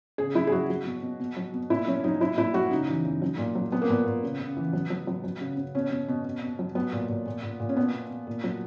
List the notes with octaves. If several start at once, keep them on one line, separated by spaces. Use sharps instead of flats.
C#3 G#4
F#3 E4
G#4
F#3 F#4
F#3
B2
B2
B2
F#3
B2
A#2 E4
F#3 C#4
F#3 D#4
F#3 E4
A#2 E4
F#3 F#4
C#3 D#4
E3
E3
F#3
A#2
F#3
F#3 B3
A#3
A#2 B3
A#2
C#3
C#3
E3
F#3
F#3
F#3
F#3
C#3
C#3
B2 C#4
B2
B2
B2
B2
F#3
F#3 B3
A#2
A#2
A#2
A#2
A#2
C#4
B2 B3
B2
B2
A#2
F#3